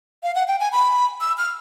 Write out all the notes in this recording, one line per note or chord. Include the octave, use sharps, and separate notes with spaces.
F5
F#5
G5
G#5
B5
E6
F6